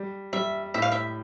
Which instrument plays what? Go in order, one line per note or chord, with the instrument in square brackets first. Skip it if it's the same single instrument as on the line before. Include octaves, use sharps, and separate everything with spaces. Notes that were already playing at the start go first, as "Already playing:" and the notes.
Already playing: [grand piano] G3
[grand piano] G3 [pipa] E5
[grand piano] A2 [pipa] E5
[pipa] F5
E5